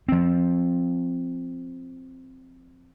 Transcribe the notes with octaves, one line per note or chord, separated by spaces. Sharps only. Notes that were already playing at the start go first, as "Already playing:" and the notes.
F3 C4